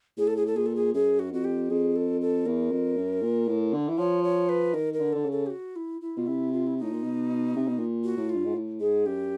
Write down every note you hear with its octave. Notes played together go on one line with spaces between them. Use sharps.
A2 G#4
A4
G#4
A4
A#2 G#4
A4
G#4
F#2 G#4
F#4
F2 F#4
G4
F2 G#4
A4
A4
E2 A#4
F2
F#2
A#2
A2
D3
E3
F3 C#5
C#5
B4
D#3 A#4
A#4
D3
D3 A4
C#3
A4
G4
F#4
E4
E4
B2 F4
C3 E4
F4
E4
A2 D#4
A#2
B2
C3
B2
A#2
F#4
A2
F4
G2
G#2
A2
G#2 G#4
F#2 G4